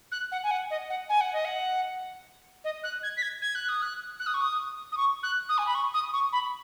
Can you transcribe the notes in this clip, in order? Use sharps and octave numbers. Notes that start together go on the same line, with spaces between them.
F#6
F#5
G#5
F#5
D#5
F#5
G#5
F#5
D#5
F#5
D#5
F#6
G#6
B6
G#6
G#6
F#6
D#6
F#6
F#6
D#6
C#6
D#6
D#6
C#6
F#6
D#6
G#5
B5
C#6
D#6
C#6
B5